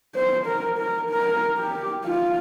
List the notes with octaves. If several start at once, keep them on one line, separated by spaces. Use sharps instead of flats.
C5
A#4
A#4
A#4
G4
F4